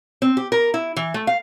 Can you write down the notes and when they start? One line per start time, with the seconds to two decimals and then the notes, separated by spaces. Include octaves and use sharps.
0.22 C4
0.37 G4
0.52 A#4
0.74 E4
0.96 E3
1.14 A3
1.27 F5